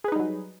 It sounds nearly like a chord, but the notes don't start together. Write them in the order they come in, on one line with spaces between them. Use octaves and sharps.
G#4 B4 D#4 G3 F#3